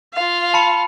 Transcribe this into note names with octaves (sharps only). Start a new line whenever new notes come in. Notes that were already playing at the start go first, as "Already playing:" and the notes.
F4 F5
A5 B5 C#7